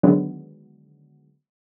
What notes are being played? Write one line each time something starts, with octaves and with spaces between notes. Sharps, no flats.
D3 D#3 F#3 G#3 B3